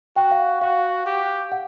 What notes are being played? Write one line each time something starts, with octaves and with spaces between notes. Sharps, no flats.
F#4 G5
F5
F#4 F5
G4
F#5